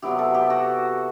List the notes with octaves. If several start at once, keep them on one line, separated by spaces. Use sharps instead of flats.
C3 F#3 B3 E4 G4
A4
G4
F#4